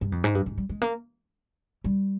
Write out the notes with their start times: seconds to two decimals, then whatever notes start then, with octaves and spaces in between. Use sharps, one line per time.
0.01 G2
0.12 F2
0.24 G#2
0.35 G2
0.46 G#2
0.58 G3
0.70 G#3
0.82 A#3
1.84 G3